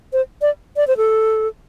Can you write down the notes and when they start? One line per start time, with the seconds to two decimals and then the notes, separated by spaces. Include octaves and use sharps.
0.13 C5
0.42 D5
0.76 D5
0.88 C5
0.97 A4